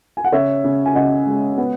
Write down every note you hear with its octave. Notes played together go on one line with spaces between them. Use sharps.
G#5
F#5
C#3 C#5 E5
C#3
G#5
C#3 D#5 F#5
G#3
B3